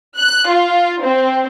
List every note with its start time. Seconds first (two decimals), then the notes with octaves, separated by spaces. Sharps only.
0.18 F#6
0.50 F4
1.04 C4